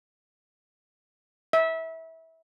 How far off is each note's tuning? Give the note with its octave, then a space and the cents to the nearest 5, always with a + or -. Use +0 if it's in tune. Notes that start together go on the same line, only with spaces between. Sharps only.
E5 -25